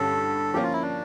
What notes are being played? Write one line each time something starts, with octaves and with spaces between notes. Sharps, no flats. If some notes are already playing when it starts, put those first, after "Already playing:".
Already playing: G2 D3 G3 C#4 A4
F3 A#3 C#4 G4
F4
E4
D4